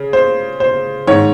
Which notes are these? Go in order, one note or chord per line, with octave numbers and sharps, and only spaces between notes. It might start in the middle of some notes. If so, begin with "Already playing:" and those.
Already playing: C#3
C5
C5
G#2 D#3 C#5